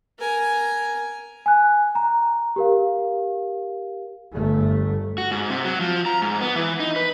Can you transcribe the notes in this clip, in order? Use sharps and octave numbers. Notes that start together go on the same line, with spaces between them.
A#4 G#5
G#5 F#6
A#5
G4 A#4 F5
G1 A3
F#4
G#2
C3
F#3
F3
A#5
G#2
B3
E3
D#4
B4